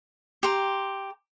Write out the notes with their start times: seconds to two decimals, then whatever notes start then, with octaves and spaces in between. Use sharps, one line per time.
0.43 G4 A#5 C6